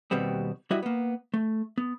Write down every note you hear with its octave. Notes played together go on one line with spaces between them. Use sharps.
D#2 B2 G3 B3 C4
G3 E4 F#4 D#5 E5
A#3 B3
A3
B3